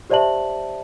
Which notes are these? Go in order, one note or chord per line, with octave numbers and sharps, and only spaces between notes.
G4 C5 D5 E5 A5 F#7